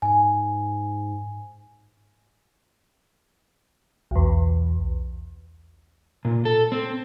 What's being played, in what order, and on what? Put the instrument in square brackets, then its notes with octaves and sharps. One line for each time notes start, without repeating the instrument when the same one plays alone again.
[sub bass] G#2 [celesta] G#5
[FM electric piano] B1 E2
[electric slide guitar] A#2
A4
C4